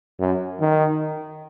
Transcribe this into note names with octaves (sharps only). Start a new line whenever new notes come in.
F#2
D#3